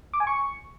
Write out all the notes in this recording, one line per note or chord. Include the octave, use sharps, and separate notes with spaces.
D6
G#5
C#6